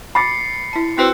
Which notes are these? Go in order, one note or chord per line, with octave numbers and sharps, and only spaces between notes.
B5 D6 A6 C7 C#7
E4 A5
C4 E4 F#4 B4 E6 F#6